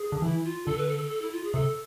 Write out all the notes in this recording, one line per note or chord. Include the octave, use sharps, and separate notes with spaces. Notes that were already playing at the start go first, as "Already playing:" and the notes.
Already playing: G#4
D3
E3 E4
F4
D3 A4
B4
A4
A4
A4
E4
F4
G#4
C3 A4